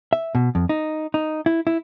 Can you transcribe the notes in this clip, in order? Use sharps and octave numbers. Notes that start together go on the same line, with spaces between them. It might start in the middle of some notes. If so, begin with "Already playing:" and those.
E5
B2
F2
D#4
D#4
E4
E4